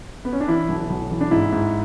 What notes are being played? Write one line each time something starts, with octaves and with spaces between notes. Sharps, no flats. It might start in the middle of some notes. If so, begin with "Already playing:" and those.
B3
C#4
D4
E3 E4
B1
B1
E3
D4
G#2 E4
G#2